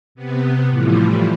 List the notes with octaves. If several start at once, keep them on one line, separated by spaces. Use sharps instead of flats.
C3 B3
A2 E3 F3 G3